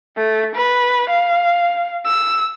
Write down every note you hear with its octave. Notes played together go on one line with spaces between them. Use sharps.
A3
B4
F5
E6